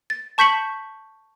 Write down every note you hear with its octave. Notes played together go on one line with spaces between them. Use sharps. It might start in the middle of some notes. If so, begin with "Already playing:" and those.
A6
A5 C#6 G6 B6 C#7 F#7